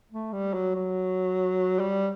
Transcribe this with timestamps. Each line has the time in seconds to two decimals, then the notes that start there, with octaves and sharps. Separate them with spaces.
0.12 A3
0.33 G3
0.54 F#3
0.75 F#3
1.79 G3